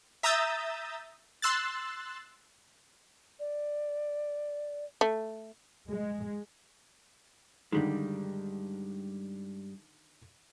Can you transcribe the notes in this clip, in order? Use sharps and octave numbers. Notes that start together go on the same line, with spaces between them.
E5 A#5 D#6 E6 G6 A6
C6 E6 F#6 A6
D5
A3
G#3
G2 D3 D#3 G3 G#3